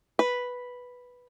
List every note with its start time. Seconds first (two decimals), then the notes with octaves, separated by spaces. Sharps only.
0.19 B4